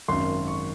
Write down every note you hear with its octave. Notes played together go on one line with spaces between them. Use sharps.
G#1 F#2 D#3 C6
C#6